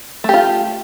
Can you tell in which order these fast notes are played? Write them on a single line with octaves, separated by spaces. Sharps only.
A3 G4 F4